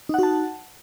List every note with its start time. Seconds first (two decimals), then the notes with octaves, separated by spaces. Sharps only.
0.09 D#4
0.14 F#5
0.19 F#4
0.23 A5